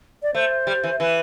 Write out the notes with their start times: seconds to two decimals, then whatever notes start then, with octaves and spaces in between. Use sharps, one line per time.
0.23 D5
0.34 A3 C5
0.67 G3
0.84 E3
1.00 E3 B4